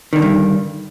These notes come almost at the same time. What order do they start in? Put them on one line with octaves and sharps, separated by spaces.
D#3 D3 E2 G2